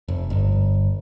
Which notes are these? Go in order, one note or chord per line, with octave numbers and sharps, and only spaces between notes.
F1
G1